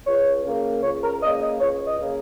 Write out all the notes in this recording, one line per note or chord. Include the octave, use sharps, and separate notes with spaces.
C#2 C#5
C#3 A#3
C#2 C#5
A#4
C#3 A#3 D#5
D#5
C#2 C#5
D#5
C#3 A#3